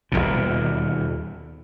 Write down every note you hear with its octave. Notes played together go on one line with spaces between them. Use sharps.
D#1 G#1 E2 B2